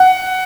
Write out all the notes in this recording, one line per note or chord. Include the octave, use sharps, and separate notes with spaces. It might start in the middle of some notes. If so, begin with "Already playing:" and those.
Already playing: F#5